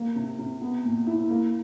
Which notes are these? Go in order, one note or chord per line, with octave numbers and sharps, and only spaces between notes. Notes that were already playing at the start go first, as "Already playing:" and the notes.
Already playing: A#3
C3
C3
B3
A#2
E4
A#3